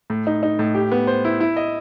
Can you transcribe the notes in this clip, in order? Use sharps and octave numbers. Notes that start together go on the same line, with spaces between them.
A2
D#4
D#4
A2
G4
B3
C5
E4
E4
D#5